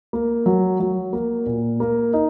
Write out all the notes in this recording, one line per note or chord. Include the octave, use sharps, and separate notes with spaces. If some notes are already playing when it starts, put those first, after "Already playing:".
A#3
F#3
F#3
A#3
A#2
A#3
D#4